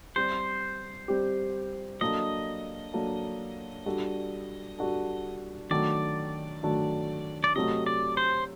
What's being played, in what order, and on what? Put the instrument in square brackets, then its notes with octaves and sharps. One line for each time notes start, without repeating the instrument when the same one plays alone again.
[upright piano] G3 C4 G4 [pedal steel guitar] C5
[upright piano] G3 C4 G4
[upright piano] F#3 A#3 D4 A4 [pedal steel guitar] D#5
[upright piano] F#3 A#3 D4 A4
G3 D4 F#4 A4
G3 D4 F#4 A4
[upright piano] D#3 F#3 A3 D4 F#4 [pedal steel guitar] D5
[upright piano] D#3 F#3 A3 D4 F#4
[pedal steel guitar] D5
[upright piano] C3 F#3 A3 [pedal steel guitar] D#5
[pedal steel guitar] D5
C5